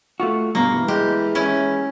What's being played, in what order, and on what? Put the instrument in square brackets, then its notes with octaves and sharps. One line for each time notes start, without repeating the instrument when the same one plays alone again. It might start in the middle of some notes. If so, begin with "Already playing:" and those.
[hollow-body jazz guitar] A3 F4 F#4
[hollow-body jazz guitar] G2 B2 [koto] A#3
[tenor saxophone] E3
[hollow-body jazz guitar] G#3 [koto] G4
[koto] C#4 E4